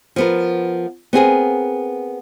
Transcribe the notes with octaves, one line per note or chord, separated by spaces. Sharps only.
F3 B3 A#4
B3 C4 G#4 A#4